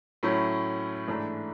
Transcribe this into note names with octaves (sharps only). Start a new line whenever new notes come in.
A2 F#3 A3 C#4 E4
G#2 E3 A3 D4